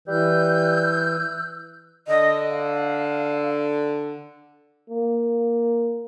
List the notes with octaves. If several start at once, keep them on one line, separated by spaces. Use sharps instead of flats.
E3 G3 E6 F#6 G6
D3 D#5
F5
A#3